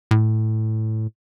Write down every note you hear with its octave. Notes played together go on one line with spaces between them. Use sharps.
A2